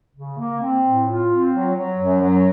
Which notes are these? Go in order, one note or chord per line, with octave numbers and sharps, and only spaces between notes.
C#3
A#3
C4
A2
F4
C4
F#3
F#3
F#2
F#3